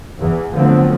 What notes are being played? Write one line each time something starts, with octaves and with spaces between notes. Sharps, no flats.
E2 E3
D3 F3 F#3 A3 B3 C4